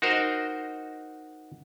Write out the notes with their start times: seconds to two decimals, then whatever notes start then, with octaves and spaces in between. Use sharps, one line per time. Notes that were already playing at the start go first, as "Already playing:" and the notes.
0.02 D#4 F#4 A#4 C5 D#5